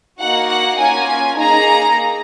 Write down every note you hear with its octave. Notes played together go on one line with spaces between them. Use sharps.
A#3 D#4 F#4 F#5
F#5
A#3 C#4 F4 G#5
A#3 D#4 G#4 A#5